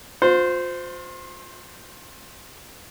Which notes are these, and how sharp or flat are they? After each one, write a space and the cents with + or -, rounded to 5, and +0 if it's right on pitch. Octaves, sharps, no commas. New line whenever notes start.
F4 +35 C5 -15